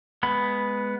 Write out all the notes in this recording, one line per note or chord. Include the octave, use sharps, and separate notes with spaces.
G#3 B3 B5